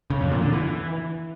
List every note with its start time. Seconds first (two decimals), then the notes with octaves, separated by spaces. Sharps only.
0.10 C#3
0.21 F2
0.31 A#2
0.42 D3
0.53 E3